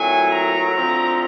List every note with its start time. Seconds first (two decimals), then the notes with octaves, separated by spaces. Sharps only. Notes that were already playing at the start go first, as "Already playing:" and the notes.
Already playing: A#2 F#3 A3 C4 E4 G#5
0.30 A#5
0.75 D3 F3 A3 C4 F4